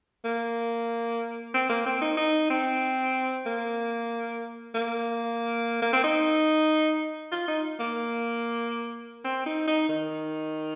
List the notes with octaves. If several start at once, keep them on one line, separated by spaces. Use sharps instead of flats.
A#3
C4
A#3
C4
D#4
D#4
C4
A#3
A#3
A#3
C4
D#4
F4
D#4
A#3
C4
D#4
D#4
D#3